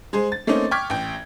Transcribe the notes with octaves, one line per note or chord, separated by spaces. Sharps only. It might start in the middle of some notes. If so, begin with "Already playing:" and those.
G#3 G#4 C5
A6
A3 A#3 C4 C#4 D#4
G5 C#6 D6 F6 G#6 B6
A1 G5